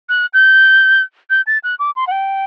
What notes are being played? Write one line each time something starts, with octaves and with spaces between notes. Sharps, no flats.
F#6
G6
G6
A6
F#6
D6
C6
F#5
G5